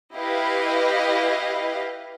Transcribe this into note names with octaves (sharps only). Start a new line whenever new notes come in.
E4 G4 B4 D#5 F5